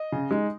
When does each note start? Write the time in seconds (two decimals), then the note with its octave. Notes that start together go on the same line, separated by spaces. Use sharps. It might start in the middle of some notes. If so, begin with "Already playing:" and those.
Already playing: D#5
0.12 C#3
0.31 G#3 D#4